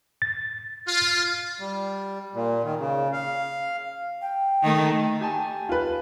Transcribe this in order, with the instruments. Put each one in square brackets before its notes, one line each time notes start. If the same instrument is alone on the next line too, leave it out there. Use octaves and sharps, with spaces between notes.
[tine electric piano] A6
[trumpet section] F4
[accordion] G3
A#2
D#3
C#3
F5
[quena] G5
[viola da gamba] D#3 A3
[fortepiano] G4 G#5 A5
[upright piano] F4 B4